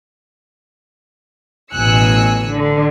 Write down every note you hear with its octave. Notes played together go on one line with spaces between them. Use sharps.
A1 B2 G#5 E6 F#6 C#7
D3